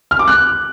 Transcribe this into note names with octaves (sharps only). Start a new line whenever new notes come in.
F6
D6
F#6